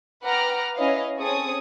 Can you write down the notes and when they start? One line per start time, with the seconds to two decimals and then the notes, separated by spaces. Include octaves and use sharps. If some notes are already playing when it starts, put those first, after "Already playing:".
0.23 B4 F#5 G5 A#5 D6 F6
0.75 C#4 E4 B4 C#5 D#5 F5
1.16 C4 C#4 G#4 A4 C#6 D#6